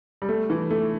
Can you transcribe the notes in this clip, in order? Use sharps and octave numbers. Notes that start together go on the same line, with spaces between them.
G3
A3
E3
A3